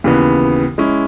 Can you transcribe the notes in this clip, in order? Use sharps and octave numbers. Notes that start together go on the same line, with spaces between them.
D#2 C#3 E3 B3
G#3 C#4 E4